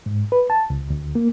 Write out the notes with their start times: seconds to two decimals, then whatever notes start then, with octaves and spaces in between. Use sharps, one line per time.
0.06 G#2
0.32 B4
0.50 A5
0.70 C#2
0.90 D2
1.15 A#3